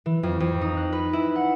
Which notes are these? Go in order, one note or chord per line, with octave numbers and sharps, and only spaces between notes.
E3
F2
F2
D#4
F#6
B4
E4
F#5